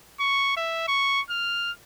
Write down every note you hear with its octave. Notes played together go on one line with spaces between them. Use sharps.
C#6
E5
C#6
F6